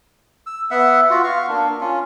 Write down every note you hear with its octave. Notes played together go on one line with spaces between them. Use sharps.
E6
B3 E5 F#5
F4 F#4
F5 C#6
A#3 D4
C#4 F4